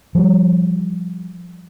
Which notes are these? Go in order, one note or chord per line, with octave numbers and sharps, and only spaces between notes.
F3 G3